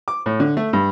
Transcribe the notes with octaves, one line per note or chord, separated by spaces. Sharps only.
D6
A2
D3
A3
G2